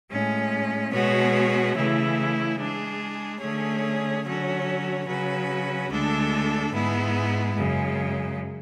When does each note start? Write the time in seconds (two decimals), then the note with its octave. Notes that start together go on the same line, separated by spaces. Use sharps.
0.10 A2 G#3 C#4
0.92 B2 G#3 B3 F#4 C#5
1.75 C#3 E3 A3 E4
2.58 G#3 D4 G#4
3.41 D3 A3 C#4 G#4 C#5
4.24 D3 F#3 C#4 F#4 C#5
5.06 C#3 F#3 C#4 F#4 B4
5.89 D2 D3 G#3 D4 A4
6.71 G#2 G#3 B3 E4
7.55 F#2 C#3 G#3